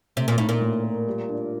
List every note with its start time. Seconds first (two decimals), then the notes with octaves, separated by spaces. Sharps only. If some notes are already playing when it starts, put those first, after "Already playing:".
0.16 C3 A3
0.28 A#2
0.38 A2 D#4
0.49 A#2
0.61 A2
0.84 A#4
1.07 G3
1.28 D4